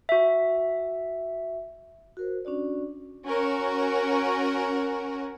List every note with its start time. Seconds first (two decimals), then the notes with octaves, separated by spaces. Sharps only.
0.09 F#4 E5
2.17 F#4 A#4 C5
2.45 C#4 D4 F#4 D5
3.26 C#4 F#4 A#4